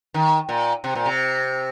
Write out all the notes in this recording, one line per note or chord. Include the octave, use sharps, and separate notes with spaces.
D#3
A#2
C3
A#2
C3